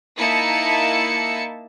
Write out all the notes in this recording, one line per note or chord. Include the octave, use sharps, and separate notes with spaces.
A#3 D#4 E4 E5 A5 C#7